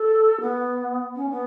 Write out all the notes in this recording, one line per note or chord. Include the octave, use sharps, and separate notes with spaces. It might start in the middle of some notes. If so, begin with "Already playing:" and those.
Already playing: A4
B3
C#4
B3